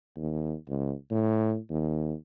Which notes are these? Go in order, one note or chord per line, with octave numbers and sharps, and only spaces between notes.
D#2
C#2
A2
D#2